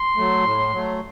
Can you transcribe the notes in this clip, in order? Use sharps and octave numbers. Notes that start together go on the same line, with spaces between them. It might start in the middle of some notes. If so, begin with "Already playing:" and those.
Already playing: C6
F#3 A3
A2
F#3 A3